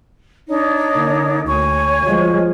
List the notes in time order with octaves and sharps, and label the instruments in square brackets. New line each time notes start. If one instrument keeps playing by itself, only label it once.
[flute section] D4 D#4 C#5
[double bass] D3 A#3
[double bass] D2 [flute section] C#5 G#5 C#6
[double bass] F3 G#3